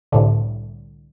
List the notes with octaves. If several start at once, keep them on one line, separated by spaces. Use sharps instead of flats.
C2 A2 D3